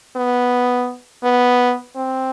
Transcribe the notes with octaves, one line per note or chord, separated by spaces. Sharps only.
B3
B3
C4